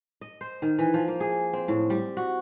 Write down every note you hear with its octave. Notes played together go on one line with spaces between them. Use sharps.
D#5
C5
D#3
E3
F3
A#3
G#4
C4
A2
G3
F#4